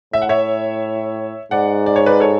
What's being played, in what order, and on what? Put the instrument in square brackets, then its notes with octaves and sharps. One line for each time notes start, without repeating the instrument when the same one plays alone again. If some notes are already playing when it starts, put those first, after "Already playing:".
[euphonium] A2 [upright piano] E5
[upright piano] F#5
C#5 E5
[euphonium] G#2 [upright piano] D5 F#5
[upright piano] D5
C#5
B4 D5
A4 C#5